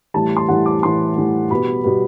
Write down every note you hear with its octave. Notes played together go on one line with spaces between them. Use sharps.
A2 E3 G3 A5
C6
A2 E3 G3 F#5
D6
A2 E3 G3 C6
A2 E3 G3
B2 G3 B3 B5
B2 G3 B3